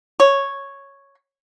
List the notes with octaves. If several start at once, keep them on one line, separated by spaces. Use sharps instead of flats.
C#5